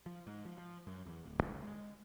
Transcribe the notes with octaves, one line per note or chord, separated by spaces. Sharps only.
F3
G#2
F3
F3
F#2
E2
D1
C#2
G#3